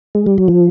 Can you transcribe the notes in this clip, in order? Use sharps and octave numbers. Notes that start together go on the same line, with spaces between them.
G#3
G3
F#3
F3